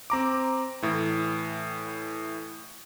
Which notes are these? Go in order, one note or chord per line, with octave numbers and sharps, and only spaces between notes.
C4 A#5 D6
A2 E3